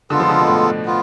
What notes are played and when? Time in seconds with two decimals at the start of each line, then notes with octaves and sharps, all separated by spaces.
0.10 D3 G#3 B3 F4 A4
0.20 F3
0.29 D3
0.38 B2
0.48 A2
0.85 B3 F4